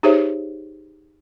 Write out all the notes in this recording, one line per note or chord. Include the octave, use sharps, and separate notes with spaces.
D#4 G4 G#4 C5 C#5 E5